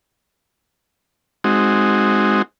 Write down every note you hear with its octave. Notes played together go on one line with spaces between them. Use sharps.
G#3 C4 D#4 F#4